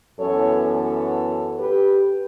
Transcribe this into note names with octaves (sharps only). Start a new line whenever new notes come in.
F#2 E3 B3 A4 C#5
A4 C#5
G4 B4